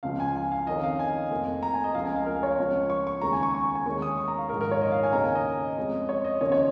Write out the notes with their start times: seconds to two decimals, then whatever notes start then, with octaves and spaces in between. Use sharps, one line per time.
0.03 C#2 C#3 F3 F5
0.20 G#5
0.36 G#5
0.52 F5
0.67 F2 D#3 C#4 D#5
0.84 F5
0.99 G#5
1.31 F1 F2 F3 A#3
1.63 A#5
1.74 G#5
1.84 D#5
1.95 C#2 C#3 F3 F5
2.05 G#5
2.16 F5
2.26 A#4
2.43 C#5
2.58 C#2 C#3 F3
2.90 C#6
3.07 C#6
3.21 D#2 C#3 G#3 A#5
3.33 G#5
3.43 C#6
3.55 C#6
3.75 G#5
3.86 D#2 D#3 G#3 C#4 C#6
4.02 D#6
4.17 C#6
4.28 A#5
4.38 F5
4.49 A#1 G#2 D#3 G#3 A#4
4.61 A#4
4.71 C#5
4.82 D#5
4.92 F5
5.03 G#5
5.13 D#2 C#3 A#3 C#4 A#5
5.24 G#5
5.35 D#5
5.77 F2 F3 G#3 C#4
6.09 C#5
6.24 D#5
6.40 D#2 C#3 F3 A#3 C#4 C#5
6.52 C#5